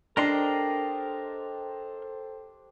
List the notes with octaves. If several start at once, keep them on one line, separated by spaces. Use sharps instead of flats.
D4 G4 A4 A#4 C5 D#5 C6